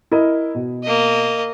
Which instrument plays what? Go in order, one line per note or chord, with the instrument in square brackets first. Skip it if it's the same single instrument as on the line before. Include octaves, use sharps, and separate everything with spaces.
[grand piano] E4 A#4 D#5
B2
[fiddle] A#3 D#5